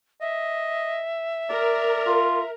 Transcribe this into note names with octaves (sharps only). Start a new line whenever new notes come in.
D#5 E5
A#4 D5
F4